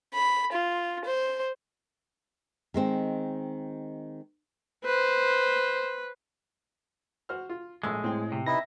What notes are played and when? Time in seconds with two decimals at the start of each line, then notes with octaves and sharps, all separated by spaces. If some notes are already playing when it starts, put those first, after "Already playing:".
0.14 B5
0.52 F4
1.05 C5
2.74 D#3 G#3 C4
4.86 B4 C5
7.29 F#4 C5 F6
7.49 F4
7.83 A#1 A2 G#3 E6
8.04 A2 C4 G5
8.32 C3
8.46 D#4 E4 B4 E5 A#6